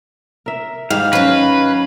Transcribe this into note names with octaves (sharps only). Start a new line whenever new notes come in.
A#4 E5
G#2 D#3 G3 F5
F#3 C#4 B4